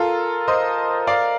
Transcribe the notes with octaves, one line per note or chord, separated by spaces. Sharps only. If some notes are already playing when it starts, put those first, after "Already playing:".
Already playing: F4 A4 A#4
C5 D#5
D5 F5